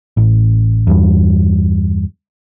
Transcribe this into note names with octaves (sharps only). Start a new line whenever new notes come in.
A1
E2 G2